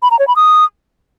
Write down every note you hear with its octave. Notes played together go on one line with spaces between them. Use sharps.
B5
A#5
C#5
B5
D#6